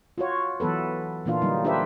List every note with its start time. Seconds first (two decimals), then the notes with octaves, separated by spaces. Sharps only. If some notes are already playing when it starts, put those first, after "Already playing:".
0.18 F4 F#4 C#5
0.60 E3 F#3 B3 A4 B4
1.25 A#2 E3 A#3 D4 F4 F5
1.42 D3 F#3 G3 A#3 D#4
1.65 D4 F4 G4 B4 C5 E5